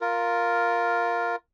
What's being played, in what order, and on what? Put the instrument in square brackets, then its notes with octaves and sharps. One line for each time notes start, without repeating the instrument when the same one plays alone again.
[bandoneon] F4 A#4